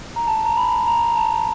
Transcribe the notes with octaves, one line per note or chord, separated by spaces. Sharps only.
A#5
A5
A#5
B5
A#5
A5